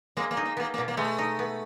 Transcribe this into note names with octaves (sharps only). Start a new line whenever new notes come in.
G#3 A#3
A#3
D#4
A#3
A#3 B3
A#3
B2
A#3
G#3 A3
D#4
B3